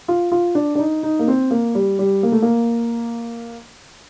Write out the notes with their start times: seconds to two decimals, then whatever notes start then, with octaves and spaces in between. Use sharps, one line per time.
0.08 F4
0.32 F4
0.55 D4
0.75 D4
0.79 D#4
1.03 D#4
1.19 A#3
1.28 C4
1.51 A#3
1.75 G3
1.99 G3
2.23 A#3
2.32 A3
2.42 A#3